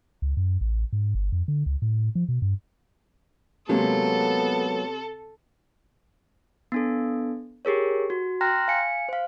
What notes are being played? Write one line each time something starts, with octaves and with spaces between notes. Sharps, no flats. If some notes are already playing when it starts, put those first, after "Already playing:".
C#2
F#2
A1
G#2
G1
F2
D3
C#2
A2
F3
B2
G2
C3 F#3 G#3 A#3 B3 A4
B3 D4 A4
G4 G#4 A#4 C#5
F#4
G5 A#5 C6 F6 F#6 A#6
F5 G#5 C#7
C5 F5